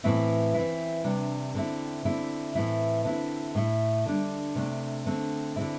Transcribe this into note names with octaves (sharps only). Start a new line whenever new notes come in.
A2 E3 A3 C4 E4
E3 C4 E4
C3 G3 D4
D3 C4 E4
D3 C4 E4
A2 E3 C4 E4
D3 C4 E4
A2 A3 E4
D3 G3 D4
C3 A3 D4
D3 A3 C4
D3 C4 E4